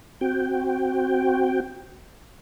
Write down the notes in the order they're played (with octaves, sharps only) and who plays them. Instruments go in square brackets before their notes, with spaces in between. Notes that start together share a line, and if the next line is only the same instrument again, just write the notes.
[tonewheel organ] C4 F#4 G5